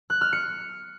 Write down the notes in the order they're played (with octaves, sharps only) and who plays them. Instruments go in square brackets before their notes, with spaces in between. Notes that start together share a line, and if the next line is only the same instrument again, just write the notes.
[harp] F#6
F6
C#7